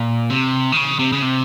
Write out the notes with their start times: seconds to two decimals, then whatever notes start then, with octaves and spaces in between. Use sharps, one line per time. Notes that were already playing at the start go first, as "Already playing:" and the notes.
Already playing: A#2
0.30 C3
0.72 D#3
0.77 C#3
0.99 C3
1.12 C#3
1.22 C3